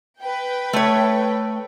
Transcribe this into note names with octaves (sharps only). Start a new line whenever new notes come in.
B4 G5
A3 C#5